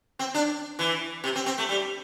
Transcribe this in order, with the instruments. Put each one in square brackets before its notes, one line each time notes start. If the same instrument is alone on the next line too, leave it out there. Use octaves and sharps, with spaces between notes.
[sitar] C4
D4
E3
C3
C4
C4
A3
G3